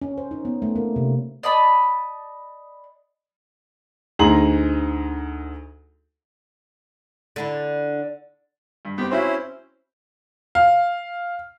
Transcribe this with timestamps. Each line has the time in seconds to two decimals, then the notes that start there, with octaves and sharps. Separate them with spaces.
0.02 C#4
0.18 C5
0.31 D#4
0.45 B3
0.62 A3
0.76 A#3
0.96 C3
1.43 D5 D#5 A5 B5
4.19 D2 D#4 G#4 A#5 C6 F#7
7.36 D3 D4 E4
8.85 G2
8.98 B3 C4 G4 G5
9.11 C4 C#4 E4 F#4 C5 E5
10.55 F5